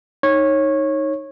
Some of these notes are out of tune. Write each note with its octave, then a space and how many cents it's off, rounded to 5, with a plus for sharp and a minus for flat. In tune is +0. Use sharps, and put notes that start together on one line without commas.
D#4 +0 C#5 -15